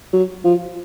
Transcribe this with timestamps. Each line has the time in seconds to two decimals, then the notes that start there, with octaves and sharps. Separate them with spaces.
0.13 F#3
0.44 F3